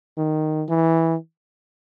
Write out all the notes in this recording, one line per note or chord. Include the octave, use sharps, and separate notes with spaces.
D#3
E3